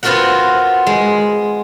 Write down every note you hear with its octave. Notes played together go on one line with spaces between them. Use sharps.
B3 C4 F4 F#4 A#4 F#5
G#3